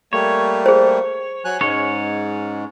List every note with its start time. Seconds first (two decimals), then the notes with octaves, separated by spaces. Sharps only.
0.13 G3 A3 A#3 C#5
0.66 G#4 C5
1.45 F#3 G#5 F#6
1.61 G#2 G#3 C#4 C#5